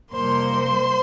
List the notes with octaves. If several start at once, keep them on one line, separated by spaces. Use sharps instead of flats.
F2 C3 G3 A#3 C5 C6